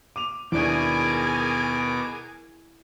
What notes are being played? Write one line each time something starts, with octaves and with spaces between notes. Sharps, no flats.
D6 D#7 F7
D#2 B2 D4 E4 G#4 A#4 G#5 D6